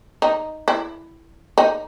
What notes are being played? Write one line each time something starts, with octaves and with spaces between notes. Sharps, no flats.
D#4
E4
D#4